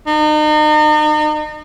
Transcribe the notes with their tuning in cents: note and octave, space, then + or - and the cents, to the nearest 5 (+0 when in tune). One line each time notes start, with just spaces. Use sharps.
D#4 -40